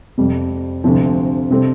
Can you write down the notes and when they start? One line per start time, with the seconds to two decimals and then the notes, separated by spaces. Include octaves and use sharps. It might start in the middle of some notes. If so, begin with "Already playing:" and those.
0.18 F2 C3 G3
0.84 D2 C3 F3
1.51 C3 G3 C4 A4